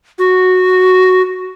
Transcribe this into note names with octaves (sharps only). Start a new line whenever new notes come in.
F#4